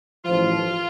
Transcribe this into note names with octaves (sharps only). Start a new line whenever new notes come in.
A1 G2 F3 F4